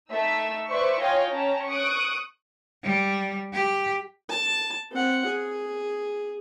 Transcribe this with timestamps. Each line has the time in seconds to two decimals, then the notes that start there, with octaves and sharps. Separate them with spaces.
0.10 A3 D#4 E5 E6
0.69 B4 C5 D5 E5 C#6
0.99 F4 C#5 D#5 F5 G5 G#5
1.29 C#4 G5 A5 A#5
1.67 C#6 D#6 F#6 D7
2.84 G3
3.53 G4
4.30 A5
4.91 C4 F#5
5.26 G#4